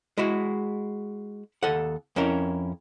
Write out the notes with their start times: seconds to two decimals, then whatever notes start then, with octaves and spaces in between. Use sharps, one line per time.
0.18 G#3 E4 F#4
1.63 D#2 A4 F#5
2.16 F2 C#4 E4 A#4